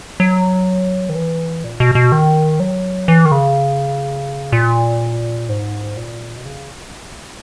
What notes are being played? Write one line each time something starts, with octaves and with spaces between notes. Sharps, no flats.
F#3
D#3
E3
A#2
B2
B2
D#3
F#3
E3
D#3
C#3
A#2
G#2
A#2
B2
C#3